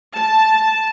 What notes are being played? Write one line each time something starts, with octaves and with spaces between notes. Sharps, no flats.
A5